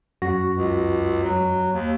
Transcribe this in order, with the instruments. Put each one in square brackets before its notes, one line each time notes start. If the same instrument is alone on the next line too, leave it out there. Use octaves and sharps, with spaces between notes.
[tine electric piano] F#2 F#4 A#6
[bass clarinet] C#2
F#3
D#2